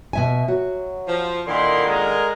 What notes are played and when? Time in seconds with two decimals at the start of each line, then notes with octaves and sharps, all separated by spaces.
0.13 B2 E5 G#5
0.48 F#3 F#4
1.07 F3
1.47 A#2 D3 D#3 E4 A#4 C6
1.86 G#3 A#4